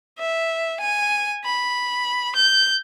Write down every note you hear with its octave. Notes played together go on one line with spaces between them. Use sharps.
E5
G#5
B5
G6